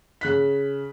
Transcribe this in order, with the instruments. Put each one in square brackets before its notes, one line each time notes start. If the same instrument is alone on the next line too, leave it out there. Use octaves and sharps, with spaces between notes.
[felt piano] C#3 F#6 B6